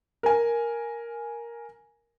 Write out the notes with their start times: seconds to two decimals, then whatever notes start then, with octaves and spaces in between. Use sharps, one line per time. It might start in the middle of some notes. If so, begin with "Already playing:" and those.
0.23 A#4 G#5